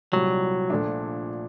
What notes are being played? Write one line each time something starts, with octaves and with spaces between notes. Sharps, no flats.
C2 A#2 F#3 G3
A#1 A#2 A3 D4